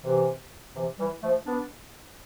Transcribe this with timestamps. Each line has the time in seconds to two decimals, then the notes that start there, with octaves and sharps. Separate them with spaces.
0.03 C3 E3
0.75 C3 E3
0.99 E3 G3
1.23 F3 A3
1.46 B3 D4